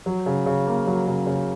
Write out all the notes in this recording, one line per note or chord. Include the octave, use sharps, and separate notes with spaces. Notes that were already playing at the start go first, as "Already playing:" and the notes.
F#3
C#3
C#3
A#3
F#3
C#3
C#3